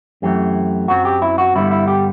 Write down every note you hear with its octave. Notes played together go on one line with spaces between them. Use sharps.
F#2 E3 A3 C4 G4
F#2 F#3 C4 F#4
G4
E4
F#4
G2 D3 G3 B3 E4
E4
G4